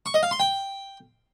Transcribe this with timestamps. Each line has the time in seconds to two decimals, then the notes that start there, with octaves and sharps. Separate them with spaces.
0.06 C#6
0.14 D#5
0.23 F5
0.31 C6
0.40 G5